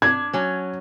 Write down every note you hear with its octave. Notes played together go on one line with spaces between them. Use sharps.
D4 G#6
F#3 C#4